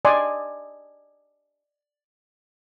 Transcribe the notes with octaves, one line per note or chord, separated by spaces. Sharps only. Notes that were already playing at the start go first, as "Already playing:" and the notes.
D5 D#5 G#5 C6 D6